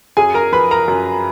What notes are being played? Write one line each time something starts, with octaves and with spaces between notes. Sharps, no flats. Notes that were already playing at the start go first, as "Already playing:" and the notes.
F#2 G#4 G#5
A#4 A#5
F3 B4 B5
A#4 A#5
F#2